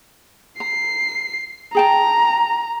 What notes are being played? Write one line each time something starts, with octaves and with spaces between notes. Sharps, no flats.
A#5 C7
G#4 G5 A5 A#5